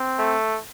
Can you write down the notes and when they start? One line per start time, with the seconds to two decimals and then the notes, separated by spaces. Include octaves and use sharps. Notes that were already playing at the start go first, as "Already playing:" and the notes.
Already playing: C4
0.19 A3